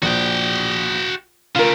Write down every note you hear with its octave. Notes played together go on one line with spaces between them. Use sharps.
A#1 F#4 G5
C#3 A3 F4 A#4